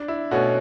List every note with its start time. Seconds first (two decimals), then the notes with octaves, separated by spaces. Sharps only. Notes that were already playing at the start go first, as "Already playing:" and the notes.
Already playing: D4
0.08 E4
0.31 B2 A3 C#4 F#4